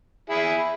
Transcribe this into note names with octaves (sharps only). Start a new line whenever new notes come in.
E4 G#4